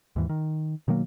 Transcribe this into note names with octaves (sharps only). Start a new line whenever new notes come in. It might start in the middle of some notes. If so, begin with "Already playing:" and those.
D#2 G#2 E3
D#3
B2 D#3 F#3 A#3